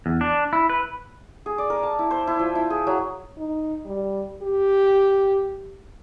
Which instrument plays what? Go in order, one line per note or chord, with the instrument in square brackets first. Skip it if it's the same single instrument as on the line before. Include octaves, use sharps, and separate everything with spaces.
[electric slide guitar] E2
D4
E4
B4
[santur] G#4
D5
A#4
A5
E4
C5
E4
F3
E4
G#4
F#3
[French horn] D#4
G3
G4